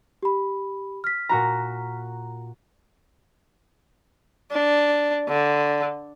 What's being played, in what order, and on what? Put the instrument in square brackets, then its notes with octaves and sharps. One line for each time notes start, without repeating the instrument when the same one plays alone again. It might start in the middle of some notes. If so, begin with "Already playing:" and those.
[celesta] G4 B5
F6 B6
[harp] A#2 F#4 A#5
[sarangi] D4
D3